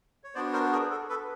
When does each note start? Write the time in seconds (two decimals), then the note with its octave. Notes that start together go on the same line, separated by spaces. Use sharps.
0.24 C#5
0.35 B3 D4 F#4 C5 D5
0.53 A#4 C5
0.72 G#4 A#4
0.90 A4
1.09 A4 B4